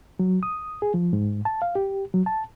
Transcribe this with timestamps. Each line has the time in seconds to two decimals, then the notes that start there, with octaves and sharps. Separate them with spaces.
0.19 F#3
0.43 D#6
0.82 G#4
0.94 F3
1.13 G#2
1.45 A5
1.62 F5
1.75 G4
2.14 F#3
2.26 A5